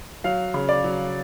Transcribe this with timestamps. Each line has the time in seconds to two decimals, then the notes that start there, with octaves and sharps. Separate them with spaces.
0.24 F#3 F5
0.54 C#3
0.69 D5
0.84 F#3